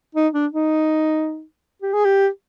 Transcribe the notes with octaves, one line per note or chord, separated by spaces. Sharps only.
D#4
D4
D#4
G4
G#4
G4